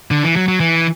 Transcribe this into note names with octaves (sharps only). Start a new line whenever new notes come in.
D3
E3
F#3
F#3
E3